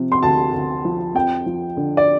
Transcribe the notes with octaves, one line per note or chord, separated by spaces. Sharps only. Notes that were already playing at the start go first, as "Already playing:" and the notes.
Already playing: C3 F3
C6
D2 A5
D2
F3
F2 G5
F3
D3
D5